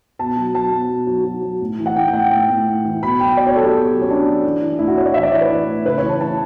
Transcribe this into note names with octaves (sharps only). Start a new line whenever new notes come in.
B2 A5
F#3
F#3 A5
B2
B2
F#3
F#3
F#3
A2
E3
F#5
E3 G5
G5
A2 F#5
A2 G5
A2
A2
E3
B2 B5
F#3 G5
B2 D5
C#5
F#3 A4
G4
B2
F#3
C#4
F#3 D4
F#3
E3
E3
A2 E4
F#4
A2 C#5
D5
E3 E5
D5
E3 C#5
B4
E3
A2
C#3 B4
C#5
E3
A5
E3 A5